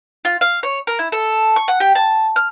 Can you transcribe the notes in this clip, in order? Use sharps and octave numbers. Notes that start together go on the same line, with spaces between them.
F4
F5
C#5
A#4
E4
A4
C#6
F#5
G4
A5
F6